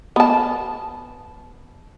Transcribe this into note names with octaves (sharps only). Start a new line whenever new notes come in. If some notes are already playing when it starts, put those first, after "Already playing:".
B3 A5